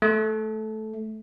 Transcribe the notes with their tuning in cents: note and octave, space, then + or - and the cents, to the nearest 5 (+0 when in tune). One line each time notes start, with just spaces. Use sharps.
A3 -15